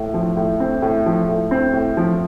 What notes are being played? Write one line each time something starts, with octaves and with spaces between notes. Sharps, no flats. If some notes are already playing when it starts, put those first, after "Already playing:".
Already playing: A2
F3
A2
C4
A2
F3
A2
C4
A2
F3